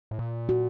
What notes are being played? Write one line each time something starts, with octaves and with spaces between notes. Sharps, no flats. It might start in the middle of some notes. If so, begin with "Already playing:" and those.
A2
A#2
F#4